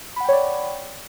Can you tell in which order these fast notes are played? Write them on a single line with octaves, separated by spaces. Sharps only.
B5 F#5 G5 C#5 D5